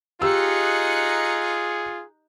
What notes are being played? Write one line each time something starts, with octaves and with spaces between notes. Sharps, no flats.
D#4 F4 G4 G#4 E6 F#6 C#7